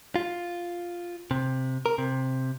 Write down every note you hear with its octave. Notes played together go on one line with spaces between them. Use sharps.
F4
C3
A#4
C3